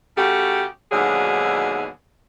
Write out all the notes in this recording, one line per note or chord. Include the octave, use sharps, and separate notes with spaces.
C#3 A3 F#4 G4
D#2 G#2 B2 D3 F#3 G#4